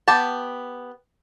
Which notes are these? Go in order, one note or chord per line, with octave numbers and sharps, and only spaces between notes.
B3 G4 G5 A5